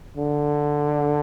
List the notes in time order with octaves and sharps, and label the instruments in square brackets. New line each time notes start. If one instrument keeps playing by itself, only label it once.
[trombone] D3